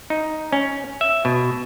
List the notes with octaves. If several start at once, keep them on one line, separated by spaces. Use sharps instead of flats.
D#4
C#4
E5
B2